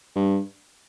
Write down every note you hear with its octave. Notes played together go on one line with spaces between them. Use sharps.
G2